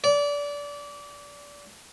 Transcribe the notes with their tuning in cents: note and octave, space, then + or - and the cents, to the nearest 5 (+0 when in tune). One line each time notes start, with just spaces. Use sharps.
D5 -25